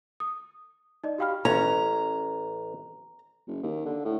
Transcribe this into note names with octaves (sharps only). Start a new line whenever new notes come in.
D#6
D#4 D5 D#5
F#4 G4 F5 G5 B5 F6
A1 C#4 A#5
F#1
D#2
D3
A2